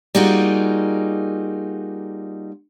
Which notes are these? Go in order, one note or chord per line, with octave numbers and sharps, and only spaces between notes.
G3 A#3 D#4 F4 F#4 G#4